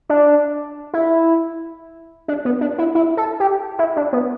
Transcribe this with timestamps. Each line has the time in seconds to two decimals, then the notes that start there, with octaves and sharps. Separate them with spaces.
0.09 D4
0.94 E4
2.28 D4
2.45 B3
2.61 D4
2.78 E4
2.95 E4
3.17 A4
3.40 G4
3.79 E4
3.96 D4
4.13 B3